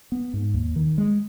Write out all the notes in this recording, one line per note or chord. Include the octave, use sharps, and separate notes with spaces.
B3
G#2
D#2
D#3
G#3